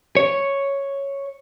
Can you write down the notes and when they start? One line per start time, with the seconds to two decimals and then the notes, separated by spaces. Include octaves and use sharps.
0.17 C#5